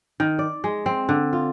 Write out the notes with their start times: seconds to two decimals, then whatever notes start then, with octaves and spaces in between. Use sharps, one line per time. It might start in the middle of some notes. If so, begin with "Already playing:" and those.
0.20 D#3
0.39 D5
0.64 G#3
0.86 C4
1.09 D3
1.33 F4